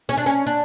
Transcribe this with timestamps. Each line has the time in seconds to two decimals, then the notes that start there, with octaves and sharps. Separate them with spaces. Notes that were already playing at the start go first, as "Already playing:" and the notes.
0.09 C#4
0.17 D4
0.26 C#4
0.47 D4